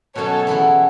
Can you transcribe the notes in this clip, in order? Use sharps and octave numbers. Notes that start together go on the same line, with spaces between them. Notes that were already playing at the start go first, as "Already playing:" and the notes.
B2 F#3 C#4 A4 C#5
E3 B3 E4 G#4